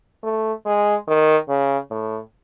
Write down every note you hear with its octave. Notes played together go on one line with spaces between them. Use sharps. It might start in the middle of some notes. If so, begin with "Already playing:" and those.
A3
G#3
D#3
C#3
A2